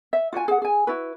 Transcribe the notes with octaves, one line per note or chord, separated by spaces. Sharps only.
E5
F4 F#4 D#5 G#5
G#4 F#5
G#4 G#5
E4 F#4 B4